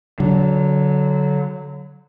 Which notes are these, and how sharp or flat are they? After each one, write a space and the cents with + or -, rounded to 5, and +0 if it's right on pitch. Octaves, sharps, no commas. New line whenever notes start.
D3 -25 F#3 +0